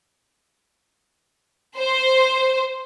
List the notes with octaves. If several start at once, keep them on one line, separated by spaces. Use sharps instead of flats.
C5